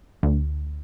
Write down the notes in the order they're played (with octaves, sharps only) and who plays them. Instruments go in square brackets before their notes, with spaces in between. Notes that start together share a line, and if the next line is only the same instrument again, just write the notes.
[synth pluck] D2